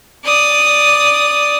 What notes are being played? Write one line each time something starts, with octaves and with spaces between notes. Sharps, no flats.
D5 D#6